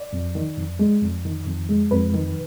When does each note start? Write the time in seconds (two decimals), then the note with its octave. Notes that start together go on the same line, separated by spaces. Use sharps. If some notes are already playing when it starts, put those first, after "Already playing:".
Already playing: D5
0.13 F2
0.35 D#3
0.57 F2
0.79 G#3
1.01 F2
1.25 D#3
1.46 F2
1.69 G#3
1.91 F2 B4
2.14 D#3